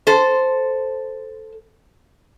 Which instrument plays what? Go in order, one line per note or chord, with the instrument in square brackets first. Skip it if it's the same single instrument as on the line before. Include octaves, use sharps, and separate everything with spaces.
[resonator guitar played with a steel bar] A4 C5